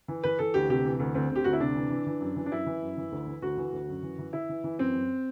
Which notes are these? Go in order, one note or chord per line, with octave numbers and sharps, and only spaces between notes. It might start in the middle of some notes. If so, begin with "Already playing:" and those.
E3
E3 B4
E3 A4
D2 G4
C3 G4
E3
D2
D2 C4
D2
G4
D2 F#4
E4
C3 D4
E3
E3
E3
F#2
E3
D4
F#2 E4
E3
F#2
E3
D2
E3
D2 F#4
E3
D2
F#2
E3
E3
E3 E4
E3
E3
F#2 C4
F#2